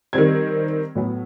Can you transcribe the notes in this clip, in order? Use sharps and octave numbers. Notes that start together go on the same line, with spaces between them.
D#3 G3 C4 G#6
A2 F#3 B3